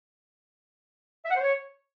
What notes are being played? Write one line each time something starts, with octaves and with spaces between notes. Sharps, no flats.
E5
F#5
C5
C#5